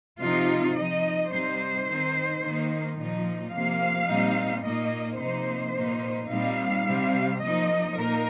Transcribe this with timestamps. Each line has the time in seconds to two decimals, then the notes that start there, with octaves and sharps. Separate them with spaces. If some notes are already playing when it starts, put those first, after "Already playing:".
0.20 C3 F3 C4 D#4 F4
0.75 F3 D#4 D#5
1.30 C3 G3 D#4 C5
1.87 D#3 C4 D#4
2.41 D#3 A#3 D#4
2.98 A#2 F3 D#4
3.52 C3 F3 A#3 F5
4.08 A#2 G3 C4 D#4
4.63 A#2 A#3 D#4 D#5
5.19 C3 F3 A#3 D#4 C5
5.75 A#2 A#3 D#4
6.29 A#2 G3 C4 D#4 F5
6.85 C3 G3 C4
7.41 F3 A#3 D#4 D#5
7.96 A#2 A#3 D#4 A#4